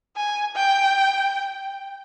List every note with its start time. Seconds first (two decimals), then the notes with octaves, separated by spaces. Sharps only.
0.16 G#5
0.55 G5